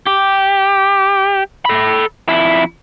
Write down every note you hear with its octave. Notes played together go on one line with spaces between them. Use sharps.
G4
A4 B5
F2 E4